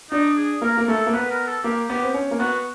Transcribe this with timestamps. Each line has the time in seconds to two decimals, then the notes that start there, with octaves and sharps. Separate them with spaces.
0.11 D4 D#4
0.37 G#4
0.62 A#3 A#4
0.78 A#3
0.88 A3 A4
1.06 A#3
1.13 B3 B4
1.30 A#4
1.47 A4
1.64 A#3 G4
1.89 B3 G4
2.03 C4
2.14 C#4
2.31 A#3
2.40 B3 F#4